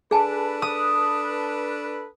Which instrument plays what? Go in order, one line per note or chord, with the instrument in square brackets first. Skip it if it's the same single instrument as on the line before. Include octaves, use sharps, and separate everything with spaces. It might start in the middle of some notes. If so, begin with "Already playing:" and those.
[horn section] D4 A4 B4 [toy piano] G#4 G#5 A5
[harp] D#6